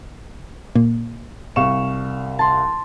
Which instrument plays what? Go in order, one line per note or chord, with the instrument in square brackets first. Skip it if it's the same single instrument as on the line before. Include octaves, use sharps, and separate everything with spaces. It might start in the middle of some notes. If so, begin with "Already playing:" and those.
[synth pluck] A#2 A#3
[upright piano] C2 F5 E7 [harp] C#6
[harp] A5 C6